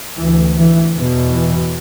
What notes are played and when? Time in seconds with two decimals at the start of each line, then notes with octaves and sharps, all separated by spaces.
0.18 D2 E3
0.56 E3
0.94 E2 B2
1.31 E3